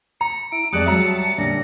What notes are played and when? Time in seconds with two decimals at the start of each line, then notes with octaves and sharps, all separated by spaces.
0.21 A#5 C#7
0.52 E4 D7
0.73 F2 G3 G#3 D5 A5 D#6 F#6 C#7
0.86 F#3 E5 A#5
1.38 A#2 D3 G3 C#4 D4 A#6